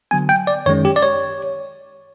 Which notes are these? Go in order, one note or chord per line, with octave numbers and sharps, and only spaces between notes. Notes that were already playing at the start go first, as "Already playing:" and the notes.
D3 F#3 B3 G#5
G5
D5
F#2 D#3 G#3 C#4 C#5
G4
D5
C#5